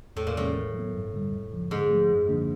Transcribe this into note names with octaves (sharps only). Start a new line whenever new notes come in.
E2 A2
A#2
A2 C3 E3 G#3 C#4
D#3
F#3
B3
G2
D3 G3
F2
C#3 F3
G#2 D3
F3 A3
F#2
D3 F3 A#3 D4